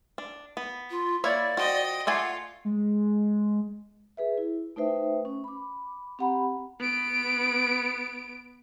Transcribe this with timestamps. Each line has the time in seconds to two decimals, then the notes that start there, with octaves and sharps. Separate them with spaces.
0.18 D4
0.57 B3
0.90 F4
1.24 A#3 E4 C#5 D5
1.57 F3 F#4 D#5 G5
2.07 A3 F4 D5 F#5 G#5
2.65 G#3
4.17 G#4 B4 E5
4.38 E4
4.76 A3 D#4 B4 C5 E5 G5
5.25 C#4
5.44 B5 D6
6.19 C4 G4 F#5 A#5 B5
6.80 B3 D7